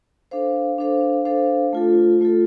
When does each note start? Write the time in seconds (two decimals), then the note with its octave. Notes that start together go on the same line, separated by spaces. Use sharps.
0.31 D4 A4 C5 F5
0.78 D4 A4 C5 F5
1.25 D4 A4 C5 F5
1.73 A3 F4 A4
2.21 A3 F4 A4